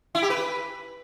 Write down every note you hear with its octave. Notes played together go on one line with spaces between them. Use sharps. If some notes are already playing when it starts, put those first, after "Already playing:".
E4
G4
B4